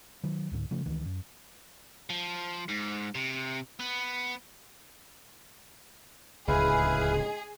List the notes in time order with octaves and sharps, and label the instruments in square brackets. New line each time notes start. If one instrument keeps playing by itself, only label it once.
[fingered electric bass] D#3 F#3
C#2 G#2 D3
C#3 F3 A3
C#2 D#3 E3
F#2
[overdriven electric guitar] F3
G#2
C3
B3
[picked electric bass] D1 C#2 [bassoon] G#3 [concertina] E4 B4 F5 [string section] G#4